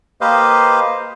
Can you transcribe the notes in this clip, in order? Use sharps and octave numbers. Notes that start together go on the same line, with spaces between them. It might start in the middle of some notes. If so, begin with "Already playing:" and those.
A#3 G4 B4 C5 D#5 F5